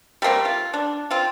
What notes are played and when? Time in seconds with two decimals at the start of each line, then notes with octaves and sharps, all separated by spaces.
0.22 G3 A3 A#3 C4
0.45 F4
0.74 D4
1.10 C4 F4